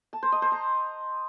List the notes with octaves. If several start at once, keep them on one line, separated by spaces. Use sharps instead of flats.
A5
C5
D#5
C5
A#5